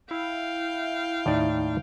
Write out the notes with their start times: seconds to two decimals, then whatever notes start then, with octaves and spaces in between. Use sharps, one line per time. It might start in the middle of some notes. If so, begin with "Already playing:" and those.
0.11 E4 F5 G5
1.26 D#2 A2 D#4 D5